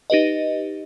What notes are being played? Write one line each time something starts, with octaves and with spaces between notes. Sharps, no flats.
D#4 G4 B4 D#5